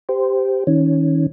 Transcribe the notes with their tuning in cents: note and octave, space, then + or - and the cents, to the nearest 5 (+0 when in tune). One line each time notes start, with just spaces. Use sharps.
G4 +0 C5 -15
D#3 +35 C#4 +0